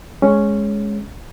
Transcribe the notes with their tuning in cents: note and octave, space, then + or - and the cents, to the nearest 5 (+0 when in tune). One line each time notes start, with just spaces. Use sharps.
G#3 +5 C#4 +0